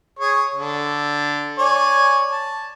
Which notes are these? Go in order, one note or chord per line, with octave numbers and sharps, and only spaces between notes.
G#4 C#5
D3
C#5 D5 G#5
A5